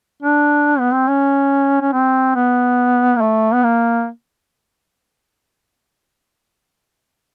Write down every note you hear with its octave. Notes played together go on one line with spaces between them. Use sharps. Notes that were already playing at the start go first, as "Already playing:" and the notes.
D4
B3
C4
C#4
C#4
C4
B3
A#3
A3
B3
A#3